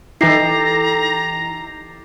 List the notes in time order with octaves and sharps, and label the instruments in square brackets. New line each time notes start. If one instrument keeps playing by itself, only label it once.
[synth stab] E3 D#4 E4 [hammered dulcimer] G4 A4 [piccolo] A#5 [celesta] A#6 C7